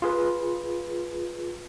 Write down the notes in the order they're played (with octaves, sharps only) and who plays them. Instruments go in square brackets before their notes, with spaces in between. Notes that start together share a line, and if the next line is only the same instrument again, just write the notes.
[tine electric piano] F4 G#4 B4